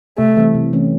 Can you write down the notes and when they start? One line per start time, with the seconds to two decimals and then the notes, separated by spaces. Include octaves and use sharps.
0.18 C3 A3
0.37 E3 G3 C4
0.55 C3
0.73 E3 A3 C#4